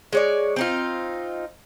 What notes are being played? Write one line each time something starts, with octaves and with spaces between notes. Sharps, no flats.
G#3 C#5 D5
C4 D#4 F4